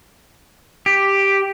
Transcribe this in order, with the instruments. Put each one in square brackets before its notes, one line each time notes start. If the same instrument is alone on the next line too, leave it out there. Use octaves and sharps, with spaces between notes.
[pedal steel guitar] G4